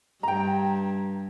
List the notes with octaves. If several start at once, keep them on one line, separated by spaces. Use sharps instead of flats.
G2 G5 A#5